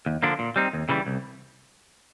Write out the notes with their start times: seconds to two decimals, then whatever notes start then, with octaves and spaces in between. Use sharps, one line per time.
0.06 D#2
0.23 D3 F3 A#3 D4
0.39 A#2
0.56 G3 C4 D#4
0.73 D#2
0.89 C#3 E3 G3
1.06 C2